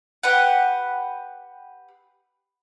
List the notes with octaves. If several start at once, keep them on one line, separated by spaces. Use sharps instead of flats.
G4 B4 F#5